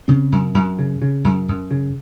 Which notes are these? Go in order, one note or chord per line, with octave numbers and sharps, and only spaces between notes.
C#3 C4
F#2
F#2
C#3
C#3
F#2
F#2
C#3